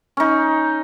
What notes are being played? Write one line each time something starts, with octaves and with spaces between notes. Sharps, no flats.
C#4 D#4